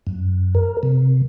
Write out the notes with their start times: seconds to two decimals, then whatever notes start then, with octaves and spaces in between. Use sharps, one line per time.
0.07 F#2
0.55 A#4
0.83 C3